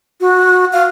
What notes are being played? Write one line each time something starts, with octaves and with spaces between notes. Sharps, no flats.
F#4
F5